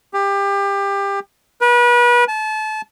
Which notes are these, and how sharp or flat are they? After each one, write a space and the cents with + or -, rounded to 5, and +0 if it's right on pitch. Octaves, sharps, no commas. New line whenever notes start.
G4 +25
B4 -35
A5 -30